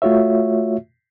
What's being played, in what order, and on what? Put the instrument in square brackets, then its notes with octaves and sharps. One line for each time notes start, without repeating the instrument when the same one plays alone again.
[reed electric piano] A3 F4 F#4 C#5 E5